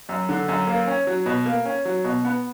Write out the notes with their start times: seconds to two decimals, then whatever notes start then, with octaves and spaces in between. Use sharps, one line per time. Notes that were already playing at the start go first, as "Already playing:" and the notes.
0.09 F#2
0.29 D3
0.48 F#2
0.67 A#3
0.87 C#4
1.07 F#3
1.26 B2
1.46 A#3
1.65 C#4
1.85 F#3
2.04 B2
2.25 B3